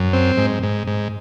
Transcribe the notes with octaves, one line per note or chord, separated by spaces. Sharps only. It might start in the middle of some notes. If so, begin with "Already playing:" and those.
Already playing: F#2
C4
G#2
G#2
G#2